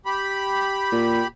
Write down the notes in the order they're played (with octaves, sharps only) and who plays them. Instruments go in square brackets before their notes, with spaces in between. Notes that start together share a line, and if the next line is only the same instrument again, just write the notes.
[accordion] G4 B5
[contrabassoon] A#2